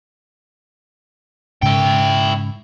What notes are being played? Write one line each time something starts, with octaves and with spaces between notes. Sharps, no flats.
G#2 C#3 E4 G5